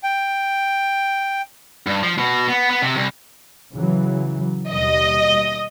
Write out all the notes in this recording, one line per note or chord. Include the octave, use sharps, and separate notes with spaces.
G5
G2
F3
B2
B3
B3
C3
C2
C#3 E3 F#3
D#2 B2 G3 D#5